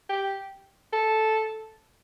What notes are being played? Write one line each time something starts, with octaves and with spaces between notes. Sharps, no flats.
G4
A4